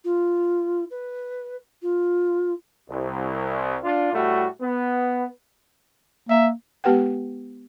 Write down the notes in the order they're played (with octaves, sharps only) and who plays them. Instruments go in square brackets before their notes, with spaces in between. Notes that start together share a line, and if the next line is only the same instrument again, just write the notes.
[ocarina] F4
B4
F4
[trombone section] C2
D4 F4
A2 G3 A3 F#4
B3
[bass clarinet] A#3 [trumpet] E5
[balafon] G#3 B3 G4 B4 F#5 G5